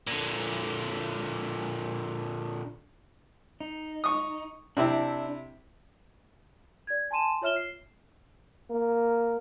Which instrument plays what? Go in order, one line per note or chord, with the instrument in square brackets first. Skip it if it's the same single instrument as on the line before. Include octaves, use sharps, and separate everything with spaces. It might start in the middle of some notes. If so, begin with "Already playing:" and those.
[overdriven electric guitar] A#2 D3
[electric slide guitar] D#4
[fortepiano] C#6 D#6
[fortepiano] C3 C4 E4 [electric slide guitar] D4
[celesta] D5 G#6
G#5 A5 C6 D#7 E7
F4 C#5 E5 F6 E7 G7
C7
[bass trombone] A#3